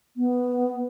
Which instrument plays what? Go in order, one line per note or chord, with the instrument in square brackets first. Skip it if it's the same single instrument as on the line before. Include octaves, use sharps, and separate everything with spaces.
[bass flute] B3